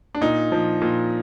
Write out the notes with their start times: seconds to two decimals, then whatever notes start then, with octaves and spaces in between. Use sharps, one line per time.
0.15 D4
0.21 A#2 D#4
0.52 F3
0.82 A#2